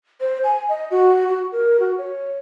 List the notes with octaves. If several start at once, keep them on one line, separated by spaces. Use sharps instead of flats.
C5
G#5
D#5
F#4
F#4
A#4
F#4
C#5